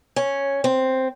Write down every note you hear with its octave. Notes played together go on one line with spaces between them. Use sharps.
C#4
C4